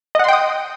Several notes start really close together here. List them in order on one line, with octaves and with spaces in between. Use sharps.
D#5 F#5 C6 G5 D#6